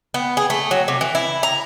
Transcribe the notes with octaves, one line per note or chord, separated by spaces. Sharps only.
B3
G#4
A3
F#3
C3
E3
E4
A#5